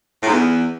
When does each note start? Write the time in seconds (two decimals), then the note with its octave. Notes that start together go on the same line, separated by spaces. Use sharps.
0.22 A2
0.27 G#2
0.32 E2